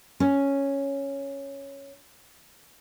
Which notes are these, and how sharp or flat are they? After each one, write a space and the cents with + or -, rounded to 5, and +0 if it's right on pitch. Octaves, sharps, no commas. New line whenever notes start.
C#4 +0